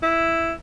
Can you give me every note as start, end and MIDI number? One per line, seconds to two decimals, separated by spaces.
0.02 0.54 64